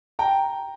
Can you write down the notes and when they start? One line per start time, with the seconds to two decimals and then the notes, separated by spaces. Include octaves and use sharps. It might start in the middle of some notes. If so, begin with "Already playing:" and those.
0.19 G5 A#5